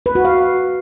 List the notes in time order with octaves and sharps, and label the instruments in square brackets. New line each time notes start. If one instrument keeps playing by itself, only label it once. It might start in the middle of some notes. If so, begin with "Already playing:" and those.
[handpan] B4
F#4
F5